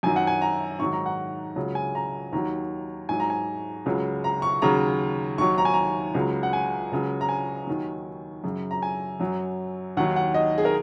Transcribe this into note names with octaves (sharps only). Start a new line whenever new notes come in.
F#2 D#3 F#3 G#5
F#5
G#5
A#5
G#2 D#3 F#3 C#6
A#5
F#5
C#2 C#3 F#3
G#5
A#5
D#2 D#3 F#3 A#5
G#2 F#3 G#5
A#5
G#5
C#2 C#3 F#3
A#5
C#6
D#2 C#3 F#3 A#5
D#2 D#3 F#3 C#6
A#5
G#5
A#5
C#2 C#3 F#3
F#5
G#5
C#2 C#3 F#3
A#5
G#5
D#2 D#3 F#3
F#2 C#3 F#3
A#5
G#5
F#2 F#3
D#2 D#3 F#3 F#5
F#5
D#5
G#4
A#4